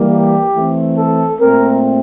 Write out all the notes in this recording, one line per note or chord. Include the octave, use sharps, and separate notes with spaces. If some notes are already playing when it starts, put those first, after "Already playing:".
Already playing: E3 G3 A#3
G4
E3 A3 C4
A4
A#2 A3 C4 A#4